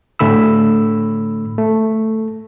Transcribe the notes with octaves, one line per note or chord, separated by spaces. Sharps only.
A2 D3 A3 B5 E6
A3